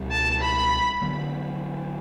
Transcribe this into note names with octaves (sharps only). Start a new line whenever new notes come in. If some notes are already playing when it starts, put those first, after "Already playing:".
Already playing: C#2 B2 G3
A5
B5
D3 F#3 B3